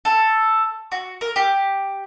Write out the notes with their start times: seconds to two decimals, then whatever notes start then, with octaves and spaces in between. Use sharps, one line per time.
0.05 A4
0.92 F#4
1.21 A#4
1.36 G4